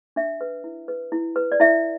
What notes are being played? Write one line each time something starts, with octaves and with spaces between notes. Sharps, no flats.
D4 E5
B4
E4
B4
E4
B4
D5
E4 E5